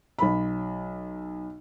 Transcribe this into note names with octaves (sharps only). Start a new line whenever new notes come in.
B1 B5